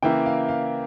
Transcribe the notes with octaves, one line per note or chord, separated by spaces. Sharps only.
C#3 E3 A#3 E4 G5
F5
F5